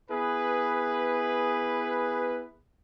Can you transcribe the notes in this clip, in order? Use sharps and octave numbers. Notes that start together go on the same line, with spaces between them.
B3 E4 G#4 B4